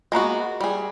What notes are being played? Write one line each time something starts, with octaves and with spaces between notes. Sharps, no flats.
G#3 A#3 B3 F#4
G3 G#4